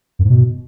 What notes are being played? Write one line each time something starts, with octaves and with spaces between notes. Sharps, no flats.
F#2
G#2
B2